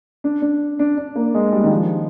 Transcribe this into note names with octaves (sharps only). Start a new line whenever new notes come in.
D4
D4
D4
D4
A#3
G#3
G3
D#3
F3